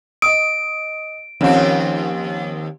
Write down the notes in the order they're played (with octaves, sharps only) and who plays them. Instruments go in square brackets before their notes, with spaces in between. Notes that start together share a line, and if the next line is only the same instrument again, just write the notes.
[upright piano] D#5 D#6 [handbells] D7
[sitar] D#2 C4 [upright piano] F3 C#4